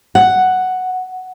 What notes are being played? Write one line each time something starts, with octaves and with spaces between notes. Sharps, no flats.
F#5